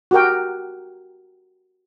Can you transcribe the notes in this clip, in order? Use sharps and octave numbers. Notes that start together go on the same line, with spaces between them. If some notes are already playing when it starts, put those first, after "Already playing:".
F#4 G4 A#4 G5